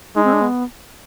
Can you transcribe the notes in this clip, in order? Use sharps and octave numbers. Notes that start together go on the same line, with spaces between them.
G#3 D#4
C4
D4
B3